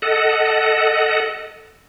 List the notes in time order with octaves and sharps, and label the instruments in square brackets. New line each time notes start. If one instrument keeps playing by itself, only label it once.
[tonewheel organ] A4 D#5 F#5